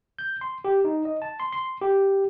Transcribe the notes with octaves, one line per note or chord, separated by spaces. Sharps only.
G6
C6
G4
D#4
D#5
A5
C6
C6
G4